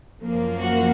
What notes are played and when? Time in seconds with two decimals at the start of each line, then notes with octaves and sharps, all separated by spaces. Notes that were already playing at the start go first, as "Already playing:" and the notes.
0.21 F#2 F3 A#3
0.61 F#4